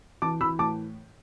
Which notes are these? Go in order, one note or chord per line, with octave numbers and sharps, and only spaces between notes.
E3 A5 D6
E3 B5 E6
A2 A5 D6